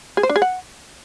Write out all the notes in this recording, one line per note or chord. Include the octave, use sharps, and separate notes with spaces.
G#4
C5
D4
G#4
F#5